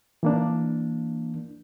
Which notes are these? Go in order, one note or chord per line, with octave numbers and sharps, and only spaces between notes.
E3 A#3 D4